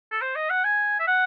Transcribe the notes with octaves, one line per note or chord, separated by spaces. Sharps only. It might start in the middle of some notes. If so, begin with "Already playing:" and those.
A4
C5
D#5
F#5
G#5
E5
F#5